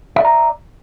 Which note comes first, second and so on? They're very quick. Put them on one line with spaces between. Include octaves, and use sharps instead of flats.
E5 D5 A#5